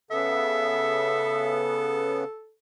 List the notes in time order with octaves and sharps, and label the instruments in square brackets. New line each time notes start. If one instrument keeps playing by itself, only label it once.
[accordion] C#3 B3 [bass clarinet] A4 [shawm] E5